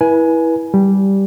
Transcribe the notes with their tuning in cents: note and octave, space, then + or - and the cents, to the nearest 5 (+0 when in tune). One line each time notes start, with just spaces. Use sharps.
E4 -10 B4 -30 G#5 +15
G3 -5 G4 +0